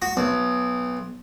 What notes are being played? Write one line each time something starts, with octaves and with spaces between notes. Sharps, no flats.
F#4
B1